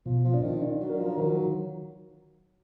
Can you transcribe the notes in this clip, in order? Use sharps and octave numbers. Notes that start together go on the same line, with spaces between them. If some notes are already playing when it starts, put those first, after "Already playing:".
B2 F3
F3
D4
D#3
D4
F#3
A#4
F3
D#3 F#3